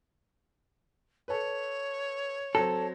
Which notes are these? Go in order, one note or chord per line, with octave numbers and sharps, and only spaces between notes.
A4 B4 C#5
F#3 C4 A4